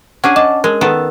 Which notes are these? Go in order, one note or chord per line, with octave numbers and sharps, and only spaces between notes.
C#4 D4 G#4 F#5
D#5 F#5 A5 D6
G#3 A#4
D#3 B3 A4